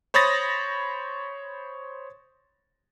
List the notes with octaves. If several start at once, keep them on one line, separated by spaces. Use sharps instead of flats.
C5 C#5 B5 D#6 A6 A#6